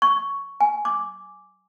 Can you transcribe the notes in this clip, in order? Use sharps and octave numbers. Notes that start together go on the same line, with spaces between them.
C#6
G#5
D6